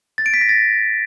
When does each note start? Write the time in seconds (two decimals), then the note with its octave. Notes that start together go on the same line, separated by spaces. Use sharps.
0.18 A6
0.26 D7
0.34 B6
0.41 A#6
0.49 A6